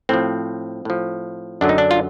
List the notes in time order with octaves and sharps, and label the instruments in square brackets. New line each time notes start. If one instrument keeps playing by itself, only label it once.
[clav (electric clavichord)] A2 F3 C4
A2 F3
F#2 D3 F#3 D4
D#4
D4
F4